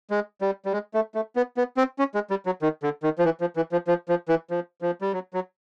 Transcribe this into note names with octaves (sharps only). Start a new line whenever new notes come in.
G#3
G3
G3
G#3
A3
A3
B3
B3
C4
C#4
G#3
G3
F#3
D#3
D3
D#3
F3
E3
F3
E3
F3
F3
F3
E3
F3
F3
G3
F#3
F#3